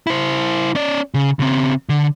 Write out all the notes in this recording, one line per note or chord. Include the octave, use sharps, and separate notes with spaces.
E4 C5
C#4 D5
C#3
C#3 C4
D3